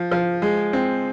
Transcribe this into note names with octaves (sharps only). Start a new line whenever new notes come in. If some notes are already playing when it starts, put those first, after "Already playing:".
Already playing: F3
F3
G#3
C4